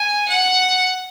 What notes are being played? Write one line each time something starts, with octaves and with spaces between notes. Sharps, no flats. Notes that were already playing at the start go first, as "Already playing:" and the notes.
Already playing: G#5
F#5